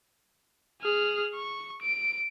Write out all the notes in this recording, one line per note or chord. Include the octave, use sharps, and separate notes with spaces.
G#4 F6
C#6
D7